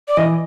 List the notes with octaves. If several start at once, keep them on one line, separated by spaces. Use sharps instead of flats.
D5
E3 D#5